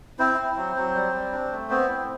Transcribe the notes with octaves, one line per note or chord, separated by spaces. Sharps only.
C4 E4 C5
E4
F#3
F#3
G3
G3
D4
A3
B3 C4 C5
E4